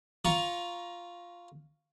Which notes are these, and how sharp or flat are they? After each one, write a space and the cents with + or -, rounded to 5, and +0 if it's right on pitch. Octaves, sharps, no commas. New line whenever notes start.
F4 +0 A#5 +15 C#6 +0